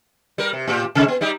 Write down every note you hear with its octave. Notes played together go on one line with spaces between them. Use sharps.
G3 A#4
C3
A2 F4 G4
C3 G#3 D#4
B3
G3 D#4 G4